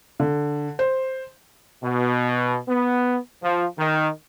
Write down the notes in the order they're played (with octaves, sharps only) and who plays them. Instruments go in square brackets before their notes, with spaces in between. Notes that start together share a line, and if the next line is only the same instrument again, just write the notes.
[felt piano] D3
C5
[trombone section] B2
B3
F3
D#3